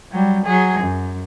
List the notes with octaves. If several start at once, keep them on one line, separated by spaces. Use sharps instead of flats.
F#3 G3
F#3 G#4
F#2